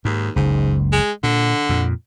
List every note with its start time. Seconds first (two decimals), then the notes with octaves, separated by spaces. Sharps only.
0.05 D#2 G#2
0.36 F#1 C#2 G#2
0.92 G#3
1.24 A#2 D3
1.69 F2 A#2